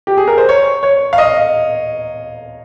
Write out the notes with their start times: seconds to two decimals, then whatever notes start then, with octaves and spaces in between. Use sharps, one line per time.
0.07 G4
0.18 G#4
0.27 A#4
0.38 C5
0.49 C#5
0.83 C#5
1.13 F5
1.18 D#5